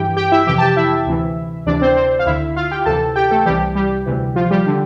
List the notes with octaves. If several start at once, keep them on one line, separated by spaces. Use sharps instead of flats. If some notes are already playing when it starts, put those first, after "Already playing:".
Already playing: G2 E3 G4 G5
G4 G5
E4 E5
F2 C3 E3 G4 G5
A5
G4 G5
E4 E5
D2 C3 E3
D2 C3 E3 D4 D5
C4 C5
C4 C5
F5
D2 D3 E4 E5
F4 F5
G4 G5
D2 C3 E3 A4 A5
G4 G5
A3 A4
C2 C3 E3 G3 G4
G3 G4
D2 C3 E3
F3 F4
G3 G4
D3